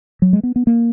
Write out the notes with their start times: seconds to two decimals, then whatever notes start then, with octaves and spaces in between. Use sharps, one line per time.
0.22 F#3
0.33 G#3
0.43 B3
0.56 B3
0.67 A#3